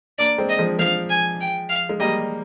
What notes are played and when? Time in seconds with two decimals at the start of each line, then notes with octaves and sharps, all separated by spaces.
0.18 A#3 D4 D5
0.38 G#3 C4
0.49 D#5
0.59 F3 G#3
0.79 F3 G#3 F5
1.09 G#5
1.40 G5
1.69 F5
1.89 G#3
2.00 G3 A#3 D#5